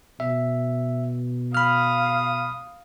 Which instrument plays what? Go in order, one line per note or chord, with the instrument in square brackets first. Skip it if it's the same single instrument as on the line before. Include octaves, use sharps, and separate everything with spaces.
[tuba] B2 [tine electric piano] E5
[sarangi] F5 [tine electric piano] B5 F6 [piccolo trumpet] D#6